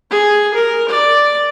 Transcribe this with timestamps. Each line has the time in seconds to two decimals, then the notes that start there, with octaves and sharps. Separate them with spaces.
0.11 G#4
0.54 A#4
0.89 D5